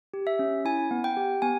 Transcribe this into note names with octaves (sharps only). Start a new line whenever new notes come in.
G4
E5
C#4
E4 G#5
B3
G5
G4
B3 G#5